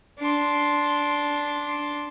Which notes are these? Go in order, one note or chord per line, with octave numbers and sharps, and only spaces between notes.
D4 C6